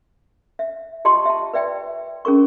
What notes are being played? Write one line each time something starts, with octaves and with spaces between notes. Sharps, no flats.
E5
F4 G4 D#5 A5 C6 C#6
E5 A5
B4 D5 E5 G5
C#4 G#4 A#4 C#6